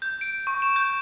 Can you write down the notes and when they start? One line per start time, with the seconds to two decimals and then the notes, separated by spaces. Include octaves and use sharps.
0.02 G6
0.21 D7
0.47 C#6
0.62 E7
0.76 G6